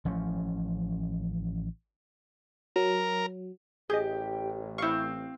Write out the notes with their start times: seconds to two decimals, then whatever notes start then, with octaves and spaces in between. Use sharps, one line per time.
0.05 A1 F3 C#4
2.76 F#3 A#4
3.90 A1 G4 G#4 D#5
4.78 C4 E4 F5 C#6